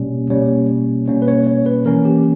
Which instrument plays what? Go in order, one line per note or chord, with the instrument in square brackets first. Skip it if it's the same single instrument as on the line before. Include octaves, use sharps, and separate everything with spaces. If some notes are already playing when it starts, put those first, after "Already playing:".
Already playing: [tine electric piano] B2 G3 A#3 C#4
B2 G3 A#3 C#4 C#5
B2 G3 A#3 C#4 C#5
B4
C#5
C#5
B4
E3 A#3 C#4 A#4
G4